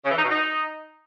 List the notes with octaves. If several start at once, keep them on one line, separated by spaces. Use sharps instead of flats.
C#3
E3
D#4
B2
D#4